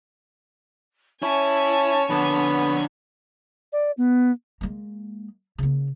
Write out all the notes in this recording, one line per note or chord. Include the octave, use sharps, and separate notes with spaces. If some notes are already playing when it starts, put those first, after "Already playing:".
C#4 E4 C#5 G#5 A5
F2 D3 B3
D5
B3
G#3 A#3
C#3 A#3